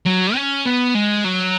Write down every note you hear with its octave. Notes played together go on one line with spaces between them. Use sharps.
F#3
C#4
B3
G#3
F#3